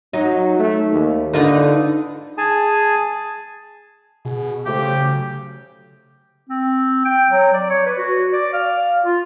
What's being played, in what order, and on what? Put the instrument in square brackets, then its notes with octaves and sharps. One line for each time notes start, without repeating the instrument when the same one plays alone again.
[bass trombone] F#3 [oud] D#4
[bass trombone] A3
D#2
[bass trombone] D3 [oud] D#4 F4 B4
[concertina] G#4 G#5 A5
[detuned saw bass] B2 [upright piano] G#4
[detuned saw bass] C#3 [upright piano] A3 C5 F5 [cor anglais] G4
[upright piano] F#3
[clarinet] C4
G5
F#3
D5
C#5
B4
F#4
D5
F5
F4